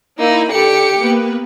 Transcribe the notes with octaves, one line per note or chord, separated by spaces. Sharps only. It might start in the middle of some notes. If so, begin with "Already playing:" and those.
A#3 D#4 E4 B5
D3 G4 C#7
A#3 B3 B4